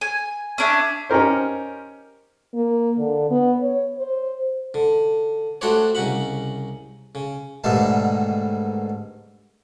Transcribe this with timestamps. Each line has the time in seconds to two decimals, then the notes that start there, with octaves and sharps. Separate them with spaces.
0.01 G#5
0.58 C#4 D4 E4
1.10 C#4 D#4 G4 A#4 C5
2.55 A#3
2.98 D3
3.30 B3
3.62 C#5
3.98 C5
4.74 D3
5.61 A3 D4 F#4 G4 C5 C#5
5.95 C2 C#3 D#4 F#5 B5
7.15 C#3
7.64 G#2 B2 D3 D#3 G3 A3